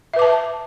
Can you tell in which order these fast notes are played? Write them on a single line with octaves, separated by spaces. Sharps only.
E5 B4 D6 A5